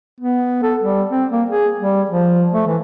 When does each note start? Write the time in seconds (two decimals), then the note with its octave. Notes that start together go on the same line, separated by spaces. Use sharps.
0.20 B3
0.62 A4
0.83 G3
1.09 C4
1.32 A#3
1.49 G#4
1.79 G3
2.10 F3
2.53 A3
2.67 E3